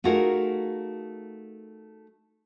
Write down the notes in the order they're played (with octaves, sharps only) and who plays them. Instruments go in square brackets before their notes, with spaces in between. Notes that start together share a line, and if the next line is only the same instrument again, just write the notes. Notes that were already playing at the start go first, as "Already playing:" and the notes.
[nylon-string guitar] A3 D#4 F4 F#4 G#4 A#4